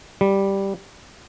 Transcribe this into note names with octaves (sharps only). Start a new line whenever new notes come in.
G3